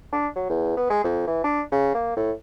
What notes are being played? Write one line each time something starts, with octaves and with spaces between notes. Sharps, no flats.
D4
F#3
E2
B3
G#3
F2
E3
D4
C#3
A#3
A2